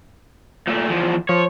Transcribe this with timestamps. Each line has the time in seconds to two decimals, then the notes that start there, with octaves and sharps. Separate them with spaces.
0.68 A#2 A3
0.90 E2 F3
1.29 F3 C#5